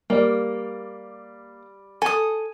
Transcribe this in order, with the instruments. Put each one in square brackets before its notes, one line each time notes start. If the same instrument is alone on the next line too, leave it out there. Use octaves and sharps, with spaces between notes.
[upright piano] G3 D5 [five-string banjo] A#3
[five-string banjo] A4 [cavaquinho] G#5 D#6